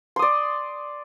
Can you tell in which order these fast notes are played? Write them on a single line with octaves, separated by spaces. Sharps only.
C6 D#6 D5